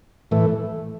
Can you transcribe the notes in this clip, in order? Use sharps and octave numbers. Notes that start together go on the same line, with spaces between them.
A2 E3 A3